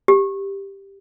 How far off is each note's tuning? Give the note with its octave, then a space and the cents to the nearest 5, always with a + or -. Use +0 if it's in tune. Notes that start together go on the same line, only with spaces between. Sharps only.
G4 +5